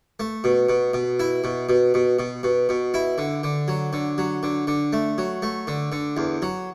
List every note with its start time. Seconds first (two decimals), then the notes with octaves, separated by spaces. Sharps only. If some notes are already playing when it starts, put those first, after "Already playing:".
0.20 A3
0.44 B2
0.69 B2
0.94 B2
1.20 E4
1.44 B2
1.69 B2
1.94 B2
2.19 B2
2.43 B2
2.69 B2
2.94 E4
3.18 D3
3.44 D3
3.68 F#3
3.93 D3
4.18 F#3
4.43 D3
4.67 D3
4.93 A3
5.18 F#3
5.43 A3
5.67 D3
5.92 D3
6.17 E2
6.42 F#3